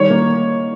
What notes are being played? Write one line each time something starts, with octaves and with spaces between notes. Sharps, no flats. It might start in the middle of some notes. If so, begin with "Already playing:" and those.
Already playing: D#3 G3 C#5
A#3